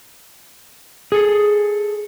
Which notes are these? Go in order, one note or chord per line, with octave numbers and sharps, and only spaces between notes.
G#4 A4